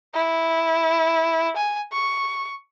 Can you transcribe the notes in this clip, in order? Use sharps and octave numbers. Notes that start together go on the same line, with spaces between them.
E4
G#5
C#6